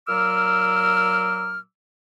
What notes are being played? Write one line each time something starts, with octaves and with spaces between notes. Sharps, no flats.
A#2 F#3 D6 E6 F6